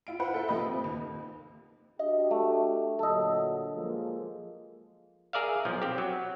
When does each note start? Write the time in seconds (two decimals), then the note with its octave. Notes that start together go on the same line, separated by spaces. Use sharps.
0.07 E4 F4 D7
0.20 B4 C5 F5 F#5
0.34 A4 E5
0.48 F3 G4 B4 D#5
0.65 C4
0.84 D#2
1.99 D4 F#4 G4 D#5
2.31 A3
2.99 A#2 D3 F#3 A4 D#5
3.74 F3 G#3 A#3
5.33 G#4 A#4 D5 E5 F5
5.65 B1 F3
5.82 C4 G4
5.98 F#3